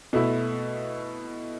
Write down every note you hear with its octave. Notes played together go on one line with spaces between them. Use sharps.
B2 A3 E4